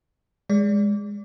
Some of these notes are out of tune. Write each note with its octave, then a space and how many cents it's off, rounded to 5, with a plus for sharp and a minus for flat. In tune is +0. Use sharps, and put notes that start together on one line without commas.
G#3 -15 D5 -25